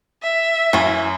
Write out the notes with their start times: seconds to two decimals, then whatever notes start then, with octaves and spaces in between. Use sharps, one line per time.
0.23 E5
0.73 F#2 E3 C#4